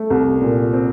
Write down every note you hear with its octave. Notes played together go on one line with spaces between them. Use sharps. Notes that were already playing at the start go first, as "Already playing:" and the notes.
Already playing: A3
C2
A#2
C4